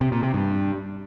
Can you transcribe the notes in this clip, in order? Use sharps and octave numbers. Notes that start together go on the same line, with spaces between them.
C3
A#2
C3
G2